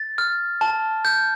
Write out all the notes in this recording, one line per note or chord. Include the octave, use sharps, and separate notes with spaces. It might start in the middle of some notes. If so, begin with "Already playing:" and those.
Already playing: A6
F6
A5
G6